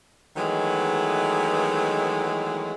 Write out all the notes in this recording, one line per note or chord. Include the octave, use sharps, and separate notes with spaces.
D#3 E3 F#3 G#3 A3 B3